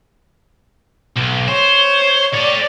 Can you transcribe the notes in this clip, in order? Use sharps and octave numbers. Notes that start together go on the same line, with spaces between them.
B1
C5 C#5
A4 C#5 D5